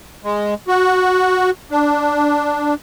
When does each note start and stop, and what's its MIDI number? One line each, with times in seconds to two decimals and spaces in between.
0.24 0.54 56
0.68 1.51 66
1.71 2.74 62